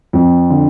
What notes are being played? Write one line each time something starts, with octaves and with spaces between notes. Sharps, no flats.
F2
D3